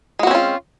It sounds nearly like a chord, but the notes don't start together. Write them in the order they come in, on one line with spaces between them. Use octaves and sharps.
G#3 F#4 C4 C#4 F4